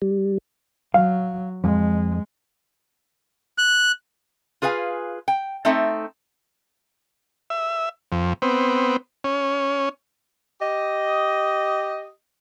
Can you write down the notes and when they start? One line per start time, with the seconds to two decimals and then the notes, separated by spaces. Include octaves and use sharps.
0.02 G3
0.94 F#3 F5
1.64 F2 G#3
3.58 F#6
4.62 F4 G#4 B4 F5 G#5
5.28 G5
5.65 A3 C4 D#4 A4 E5
7.50 E5
8.12 F2
8.42 B3 C4
9.24 C#4
10.62 G4 D#5